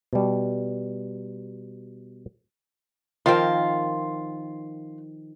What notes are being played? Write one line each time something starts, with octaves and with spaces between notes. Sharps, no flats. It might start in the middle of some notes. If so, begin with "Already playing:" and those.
B2 G3
D#3 F3 C4 F4 A#4